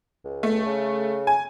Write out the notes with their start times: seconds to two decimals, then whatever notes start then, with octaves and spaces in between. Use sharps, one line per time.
0.25 C#2
0.43 A3
0.66 C#3
1.27 G#5